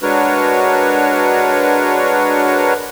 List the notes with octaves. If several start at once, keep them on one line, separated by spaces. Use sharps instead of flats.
G#3 D4 F#4 A#4 B4 C#5